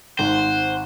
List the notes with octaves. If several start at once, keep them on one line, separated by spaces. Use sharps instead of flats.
G#1 C5 F#5